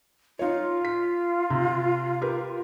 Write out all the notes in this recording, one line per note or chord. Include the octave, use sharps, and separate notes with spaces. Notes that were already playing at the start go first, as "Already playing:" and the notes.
D#4 F4 C#5
B6
C3
G4 A#4 B4